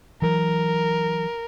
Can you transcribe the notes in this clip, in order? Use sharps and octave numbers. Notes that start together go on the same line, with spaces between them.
E3 F#3 A#4